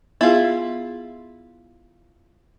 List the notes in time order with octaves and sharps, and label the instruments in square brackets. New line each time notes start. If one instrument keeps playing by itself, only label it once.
[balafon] B3 G#4 [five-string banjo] E4 F4